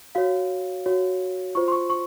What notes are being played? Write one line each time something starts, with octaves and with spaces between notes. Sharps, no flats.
F#4 C#5 F5
F#4 C#5
F4 C5 C#6
C6
C#6
C#6